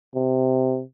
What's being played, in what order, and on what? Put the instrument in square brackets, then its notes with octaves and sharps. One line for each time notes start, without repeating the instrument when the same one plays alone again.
[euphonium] C3